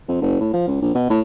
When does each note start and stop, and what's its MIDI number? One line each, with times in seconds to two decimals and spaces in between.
0.08 0.17 41
0.21 0.38 30
0.41 0.51 45
0.53 0.66 53
0.67 0.80 37
0.82 0.90 34
0.95 1.07 47
1.10 1.20 45